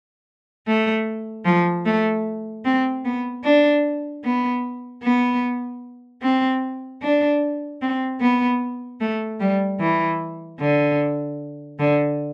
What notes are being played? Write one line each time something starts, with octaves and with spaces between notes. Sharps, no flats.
A3
F3
A3
C4
B3
D4
B3
B3
C4
D4
C4
B3
A3
G3
E3
D3
D3